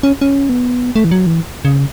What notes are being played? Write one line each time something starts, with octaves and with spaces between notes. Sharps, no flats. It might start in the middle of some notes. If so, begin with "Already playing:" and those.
C#4
C#4
B3
A3
E3
F#3
E3
C#3